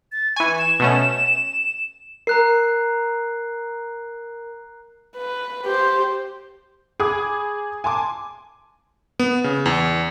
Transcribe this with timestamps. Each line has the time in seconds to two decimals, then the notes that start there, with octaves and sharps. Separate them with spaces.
0.12 A6
0.36 E3 G#5 C#6
0.59 E7
0.80 B2 A3 C#4
2.27 A#4 A#5 F#6 C7
5.17 B4
5.65 G4 C5
7.00 G#4 G#5 B5 D6 D#6 G#6
7.84 G#5 A5 C6 D6
9.19 B3
9.44 C#3
9.66 E2